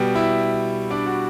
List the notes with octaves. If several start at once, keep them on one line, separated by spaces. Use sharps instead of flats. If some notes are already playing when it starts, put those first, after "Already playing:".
Already playing: B2 G3
E4 E5
D4 D5
F#4